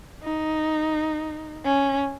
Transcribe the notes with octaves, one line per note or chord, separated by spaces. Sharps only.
D#4
C#4